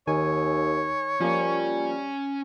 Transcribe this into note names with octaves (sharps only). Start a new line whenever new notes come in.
D#2 D#3 C#5 G#5
F3 G3 A#3 C#4